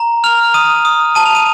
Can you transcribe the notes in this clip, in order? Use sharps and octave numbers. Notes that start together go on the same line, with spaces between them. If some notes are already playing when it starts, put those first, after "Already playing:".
Already playing: A#5
F6 F7
D#6 D#7
D#6
A5 D#7
F7
D#7